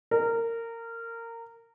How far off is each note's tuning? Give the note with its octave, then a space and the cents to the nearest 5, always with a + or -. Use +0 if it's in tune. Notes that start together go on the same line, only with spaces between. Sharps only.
A#4 -20